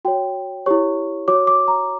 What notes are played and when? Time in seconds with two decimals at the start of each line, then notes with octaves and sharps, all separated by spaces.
0.05 F#4 C#5 G5
0.66 E4 G4 C#5 C#6
1.28 F#4 C#5 D6
1.47 D6
1.68 A#5